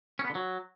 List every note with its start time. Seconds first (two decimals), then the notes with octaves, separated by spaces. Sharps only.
0.19 C#4
0.25 B3
0.30 D3
0.35 F#3